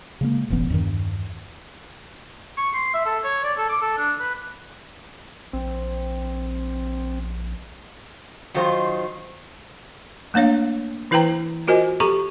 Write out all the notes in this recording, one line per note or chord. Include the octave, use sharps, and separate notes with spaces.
C#3 G#3 A#3
E1 A1 E3 B3
E2 G2 D#3
C#6
C6
E5
A4
C#5
D5
A4
D6
A4
D4
B4
A#1 C4
D#3 F#3 D#4 F4 C5
A3 A#3 D4 C#5 F5
E3 E4 B4 C5 G5 A#5
F4 F#4 A#4 C5 D#5 G#5
G4 A4 A#5 C#6